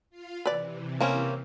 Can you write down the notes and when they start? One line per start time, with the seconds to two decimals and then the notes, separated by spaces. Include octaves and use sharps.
0.10 F4 F5
0.46 C3 E3 B4 D5
1.01 A#3 C4 C#4